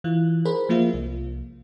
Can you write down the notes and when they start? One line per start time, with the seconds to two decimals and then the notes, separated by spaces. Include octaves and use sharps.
0.04 E3 F4 F#6
0.45 G#4 A#4 C5 B5
0.69 F3 A#3 F4 E5
0.94 C2